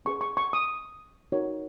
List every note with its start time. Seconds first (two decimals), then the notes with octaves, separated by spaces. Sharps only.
0.05 C#4 G#4 B4 C#6
0.21 C#6
0.37 C#6
0.53 D#6
1.32 D#4 F#4 A#4 C#5